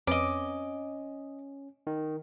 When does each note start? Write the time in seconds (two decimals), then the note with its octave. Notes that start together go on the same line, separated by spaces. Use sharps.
0.07 F2 C4 C#4 B4 D#5 D6
1.87 D#3